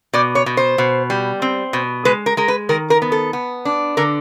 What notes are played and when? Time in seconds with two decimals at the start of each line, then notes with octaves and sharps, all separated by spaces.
0.13 B2 D5
0.35 C#5
0.46 B2
0.57 C5
0.78 B2
1.10 G3
1.42 C4
1.73 B2
2.05 G#3 B4
2.26 A#4
2.37 G#3 A#4
2.48 B4
2.69 D#3 A#4
2.90 A#4
3.02 B3
3.12 A4
3.33 B3
3.65 D4
3.97 D3 A#4